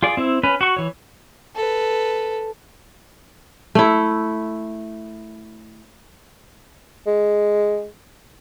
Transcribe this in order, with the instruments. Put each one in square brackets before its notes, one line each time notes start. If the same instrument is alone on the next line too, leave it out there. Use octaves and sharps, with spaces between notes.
[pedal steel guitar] F4 G#4 D5
C4 E4
C#4 B4
F#4 C#6
E3 C#5
[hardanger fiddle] A4 B4
[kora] A3 E4
[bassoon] G#3